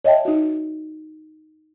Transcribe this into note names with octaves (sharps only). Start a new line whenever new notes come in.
C#5 D#5 E5 G5 A5
D#4 F#4